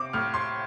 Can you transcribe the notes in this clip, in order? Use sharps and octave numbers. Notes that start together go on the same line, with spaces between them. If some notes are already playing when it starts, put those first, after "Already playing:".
Already playing: C3 C4 D6
A2 F6
C6